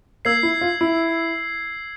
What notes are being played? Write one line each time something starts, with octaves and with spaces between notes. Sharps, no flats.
A#3 E6 G#6 C7
E4
F4
E4